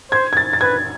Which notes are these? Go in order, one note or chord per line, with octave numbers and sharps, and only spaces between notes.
C5 G#6
G#6
A6
A6
B4 G#6